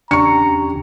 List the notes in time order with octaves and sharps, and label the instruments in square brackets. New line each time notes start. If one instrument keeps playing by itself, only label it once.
[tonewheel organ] E2 C#3 G4 [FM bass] D4 [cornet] A#5 [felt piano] C#6 C#7